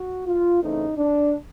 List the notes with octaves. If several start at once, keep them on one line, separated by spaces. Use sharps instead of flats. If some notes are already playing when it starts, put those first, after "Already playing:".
Already playing: F#4
F4
C#3 E3 A3 C4 D#4
D4